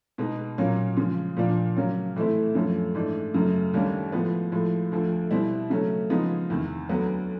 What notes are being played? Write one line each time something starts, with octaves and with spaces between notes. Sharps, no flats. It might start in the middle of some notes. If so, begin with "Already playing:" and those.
B2 G#3 B3 D#4
A#2 F#3 A#3 C#4
C#3 F3 G#3
A#2 F3 A#3 D4
C#3 F#3 A#3 C#4
A2 E3 A3 C4 E4
F#2 D3 F3 A3 C#4
G#2 E3 A3 D4
F#2 C#3 F#3 A3
D#2 D3 G3 A#3 C#4
A2 F3 G#3 B3
A2 F3 G#3
D2 D3 F3 A3
B2 G3 C4 E4
C#3 F#3 A3 C#4
C#3 F3 G#3 B3 D#4
E2 C3 D#3
D2 D3 F#3 B3